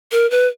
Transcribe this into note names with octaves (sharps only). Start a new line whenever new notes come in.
A#4
B4